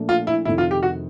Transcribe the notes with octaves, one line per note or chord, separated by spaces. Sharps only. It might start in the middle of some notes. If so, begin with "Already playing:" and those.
Already playing: A#2 F3 A3 D4
F4
E4
F2 C3 D#3 E4
F4
G4
F#4